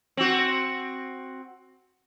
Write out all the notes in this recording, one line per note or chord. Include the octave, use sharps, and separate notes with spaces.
C4 F#4